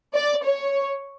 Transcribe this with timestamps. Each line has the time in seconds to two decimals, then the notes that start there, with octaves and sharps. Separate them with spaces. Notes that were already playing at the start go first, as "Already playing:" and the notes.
0.14 D5
0.43 C#5